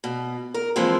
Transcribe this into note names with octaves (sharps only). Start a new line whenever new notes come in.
B2
A#4
E3 F3 G#3 A#3 C4